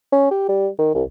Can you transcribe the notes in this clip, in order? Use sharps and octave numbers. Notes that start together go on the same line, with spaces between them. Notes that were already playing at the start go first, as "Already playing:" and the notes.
C#4
G4
G3
D#3
C2